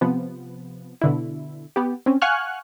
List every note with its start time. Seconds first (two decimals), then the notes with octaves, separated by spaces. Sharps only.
0.01 C3 F3 B3
1.02 B2 D3 E4
1.76 B3 G4
2.06 C4 C#4
2.22 F5 F#5 G#5 C#6 F6 F#6